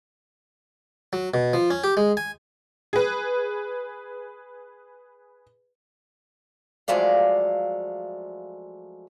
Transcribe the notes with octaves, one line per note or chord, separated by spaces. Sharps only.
F#3
B2
F3
C#4
G4
G#3
G#5
G#4 B4
F3 F#3 G#3 A3 D5 F5